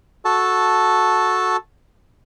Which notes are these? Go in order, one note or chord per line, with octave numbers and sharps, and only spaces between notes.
F#4 A4 A5